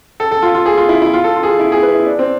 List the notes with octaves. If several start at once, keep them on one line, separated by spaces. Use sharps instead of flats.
A4
A4
F4
F4
G#4
F4
E4
E4
F4
A4
F4
G#4
F4
E4
G#4
B4
E4
D4
C4